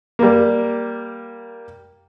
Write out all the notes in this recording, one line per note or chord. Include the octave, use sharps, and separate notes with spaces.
G3 A#3